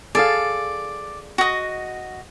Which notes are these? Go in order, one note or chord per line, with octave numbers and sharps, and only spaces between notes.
G#4 A4 D5 F5
F#4 D#5